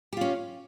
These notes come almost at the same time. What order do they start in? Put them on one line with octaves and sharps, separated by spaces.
G4 F4 C#4